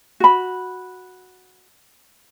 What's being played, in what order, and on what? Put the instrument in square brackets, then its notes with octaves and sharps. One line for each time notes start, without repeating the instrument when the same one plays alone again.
[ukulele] F#4 B5